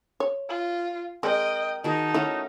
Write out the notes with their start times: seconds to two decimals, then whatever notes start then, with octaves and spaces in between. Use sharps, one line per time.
0.20 C#5
0.49 F4
1.23 G#3 C4 A#4 D#5 G5
1.84 D#3 D#4 F#4 G#4 A5
2.14 A3 C#4 E4 F#4